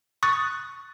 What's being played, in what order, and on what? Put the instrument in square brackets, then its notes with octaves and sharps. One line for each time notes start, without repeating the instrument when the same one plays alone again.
[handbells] C#6 D#6 F#6 A6